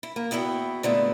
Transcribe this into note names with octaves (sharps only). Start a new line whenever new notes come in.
E4
A#3
E2 B3 E4 F#4 G5
A#2 D3 G#3 A3 B3 E4